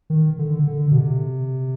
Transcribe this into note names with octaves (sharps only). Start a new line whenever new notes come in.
D#3
D3
D3
B2
C3